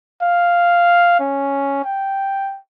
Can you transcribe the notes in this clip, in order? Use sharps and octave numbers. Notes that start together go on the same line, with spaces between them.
F5
C#4
G5